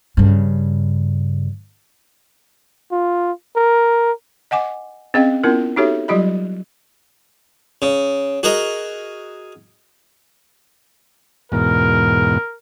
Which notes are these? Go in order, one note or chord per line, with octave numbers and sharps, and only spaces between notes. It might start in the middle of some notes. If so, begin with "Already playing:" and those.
G2 C#3
F4
A#4
D#5 F#5 G#5 D6
C4 C#4 G#4 D#5 F5 G5
B3 C#4 E4 F4 A#4
D#4 F#4 G4 A4 C#5 E5
F#3 G3 F4 G4 D#5 B5
C#3
F#4 G#4 A#4 D#5
E2 G#2 B2 A#4